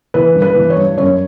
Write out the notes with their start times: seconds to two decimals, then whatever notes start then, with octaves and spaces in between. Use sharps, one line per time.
0.14 E3 B4
0.35 G2
0.42 B4
0.55 E3
0.70 C#5
0.76 G2
0.98 F#2 C#5